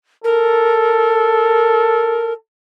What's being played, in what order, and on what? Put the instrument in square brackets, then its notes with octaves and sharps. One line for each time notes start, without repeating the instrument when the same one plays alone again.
[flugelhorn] A4 [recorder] A#4